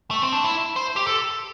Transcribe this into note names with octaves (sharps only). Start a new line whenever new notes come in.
A3
C4
D4
E4
C5
G4
A4